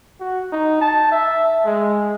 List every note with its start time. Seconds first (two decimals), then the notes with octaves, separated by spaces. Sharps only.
0.20 F#4
0.52 D#4
0.81 A5
1.12 E5
1.66 G#3